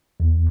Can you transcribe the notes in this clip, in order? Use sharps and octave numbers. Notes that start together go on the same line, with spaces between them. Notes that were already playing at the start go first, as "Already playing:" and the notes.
E2